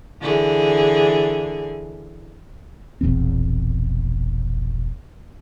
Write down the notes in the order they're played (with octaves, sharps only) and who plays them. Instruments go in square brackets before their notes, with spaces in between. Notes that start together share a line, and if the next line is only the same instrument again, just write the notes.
[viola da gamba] D3 E3 G#4
[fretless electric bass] E1 A#1 E2 C4